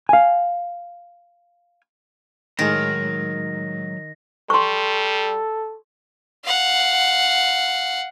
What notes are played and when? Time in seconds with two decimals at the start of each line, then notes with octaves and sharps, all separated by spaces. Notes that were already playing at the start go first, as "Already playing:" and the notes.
0.09 F5 G#5
2.59 A2 D#3 F#3 G#3 A#5 A#6
4.50 G3 A4 C6 C#6
6.45 F5 F#5